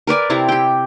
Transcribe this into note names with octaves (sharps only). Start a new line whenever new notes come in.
A#4 B4 D5 G#5
C3 C4 E4 A#5
G4 G5